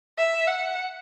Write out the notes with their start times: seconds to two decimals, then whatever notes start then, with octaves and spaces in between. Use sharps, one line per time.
0.18 E5
0.47 F#5